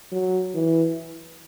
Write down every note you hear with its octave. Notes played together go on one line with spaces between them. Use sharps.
F#3
E3